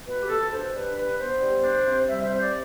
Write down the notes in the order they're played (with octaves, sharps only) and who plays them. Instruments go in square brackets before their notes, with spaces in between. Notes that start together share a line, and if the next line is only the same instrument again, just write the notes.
[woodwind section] B2 B4
G4
B2 A4
D4 C5
G3 B4
D4 B4
B3 C5
G3
D4
C3
G3 E5
C5
C3
D5